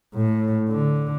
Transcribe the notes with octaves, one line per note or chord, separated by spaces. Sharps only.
A2
D3